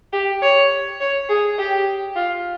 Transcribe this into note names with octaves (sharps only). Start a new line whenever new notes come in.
G4
C#5
C#5
G#4
G4
F4